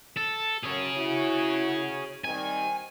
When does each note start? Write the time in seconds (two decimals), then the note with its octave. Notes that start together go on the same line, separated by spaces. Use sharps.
0.16 A4
0.63 F#2 G#4 C#5
0.95 E4 F#4
2.24 D#3 G3 C4 G#5